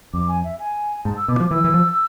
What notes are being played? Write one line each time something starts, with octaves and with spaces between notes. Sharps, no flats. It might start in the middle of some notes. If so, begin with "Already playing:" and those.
F2 D6
G#5
E5
G#5
G#2 A5
E6
B2 D6
F3 D6
E3 E6
E3
F3